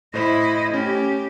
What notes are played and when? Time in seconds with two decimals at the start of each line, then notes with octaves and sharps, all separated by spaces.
0.14 A2 E4 C5 D#5 B5
0.74 A3 C#4 G4